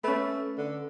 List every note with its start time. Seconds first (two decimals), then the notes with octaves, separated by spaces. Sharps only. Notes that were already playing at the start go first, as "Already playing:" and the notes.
0.04 A3 C#4 B4
0.58 D3